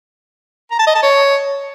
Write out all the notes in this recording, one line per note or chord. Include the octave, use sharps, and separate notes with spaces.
A#5
A5
D#5
A5
C#5